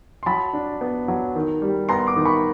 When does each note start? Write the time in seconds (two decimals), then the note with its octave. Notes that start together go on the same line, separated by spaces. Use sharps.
0.23 C6
0.26 F#3 A5 B5
0.53 D4
0.81 B3
1.08 F#3
1.36 D#3
1.62 G3
1.89 B3 A#5 C6
2.07 C6 D6
2.16 D#3
2.25 B5 C#6